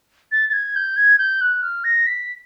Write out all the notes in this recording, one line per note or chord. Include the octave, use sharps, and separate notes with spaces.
A6
A6
G#6
G6
G#6
G6
F#6
F6
A#6
B6